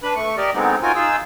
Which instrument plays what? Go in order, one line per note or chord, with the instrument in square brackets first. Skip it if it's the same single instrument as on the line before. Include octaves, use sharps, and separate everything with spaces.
[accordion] D4 B4 B5
A3 C#6
G4 A#4 D5 D#5
D3 F#3 G#3 B3 C4 D#4
D#4 F4 F#4 A#4 G#5
D#4 F4 G#4 E6